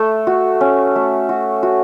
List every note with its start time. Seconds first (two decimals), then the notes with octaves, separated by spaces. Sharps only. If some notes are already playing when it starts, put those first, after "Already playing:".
Already playing: A3
0.27 F#4
0.61 C#4
0.96 A3
1.29 F#4
1.63 F#4